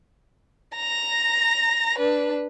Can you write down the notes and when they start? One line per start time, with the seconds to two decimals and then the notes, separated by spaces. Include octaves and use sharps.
0.76 A#5 A#6
1.98 D4 B4